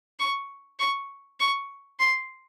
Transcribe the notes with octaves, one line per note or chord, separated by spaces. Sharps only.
C#6
C#6
C#6
C6